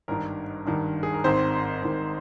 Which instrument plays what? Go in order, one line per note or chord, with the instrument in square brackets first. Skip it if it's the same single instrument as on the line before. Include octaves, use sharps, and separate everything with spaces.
[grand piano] G#1 G2 D#3 A#4
G#1 G2 D#3
G#4
A#4
G#1 G#2 D#3 C4 C5
G#1 G#2 D#3